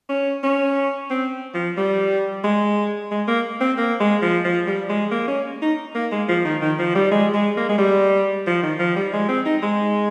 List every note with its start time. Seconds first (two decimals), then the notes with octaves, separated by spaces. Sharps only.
0.09 C#4
0.43 C#4
1.10 C4
1.54 F3
1.77 G3
2.44 G#3
3.11 G#3
3.28 A#3
3.60 C4
3.78 A#3
4.00 G#3
4.22 F3
4.44 F3
4.67 G3
4.89 G#3
5.11 A#3
5.28 C#4
5.62 D#4
5.95 A#3
6.11 G#3
6.28 F3
6.45 D#3
6.61 D#3
6.79 F3
6.95 G3
7.11 G#3
7.34 G#3
7.57 A#3
7.69 G#3
7.78 G3
8.46 F3
8.62 D#3
8.79 F3
8.96 G3
9.13 G#3
9.29 C4
9.45 D#4
9.62 G#3